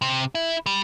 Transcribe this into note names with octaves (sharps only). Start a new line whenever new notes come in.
C3
E4
G3